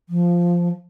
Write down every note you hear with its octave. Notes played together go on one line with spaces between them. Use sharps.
F3